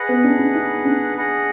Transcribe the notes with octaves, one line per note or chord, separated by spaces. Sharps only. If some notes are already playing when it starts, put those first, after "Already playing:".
Already playing: G#4 B4 D#5 F#5
B3
D4
D4
D#4
D4
G#4 D#5 F#5